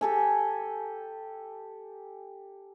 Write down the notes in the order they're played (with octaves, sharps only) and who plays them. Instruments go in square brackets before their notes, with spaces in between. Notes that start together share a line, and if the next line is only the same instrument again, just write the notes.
[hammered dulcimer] G4 A4 G#5